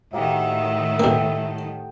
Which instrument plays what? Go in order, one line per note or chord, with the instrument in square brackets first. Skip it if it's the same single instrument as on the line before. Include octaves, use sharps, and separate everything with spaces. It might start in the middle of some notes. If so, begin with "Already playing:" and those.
[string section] A2 D#3 [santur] F#3 A#3 G4 [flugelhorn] E5
[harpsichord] B2 A#3 [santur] A4 G5